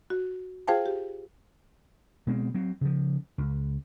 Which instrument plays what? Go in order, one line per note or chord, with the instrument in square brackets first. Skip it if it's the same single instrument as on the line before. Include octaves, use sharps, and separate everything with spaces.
[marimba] F#4
F4 G#4 C5 F5 G5 A5
G4
[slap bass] B2 G#3 C4
F#3 C4
C#3 F3
C#2